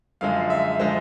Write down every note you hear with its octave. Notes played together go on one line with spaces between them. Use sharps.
F#2 D3 F3 G#3 F5
E5
D3 F3 G#3 C5